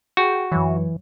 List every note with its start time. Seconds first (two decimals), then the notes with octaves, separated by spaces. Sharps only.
0.17 F#4 G#4 G5
0.52 F#2 E3 F#3 C#5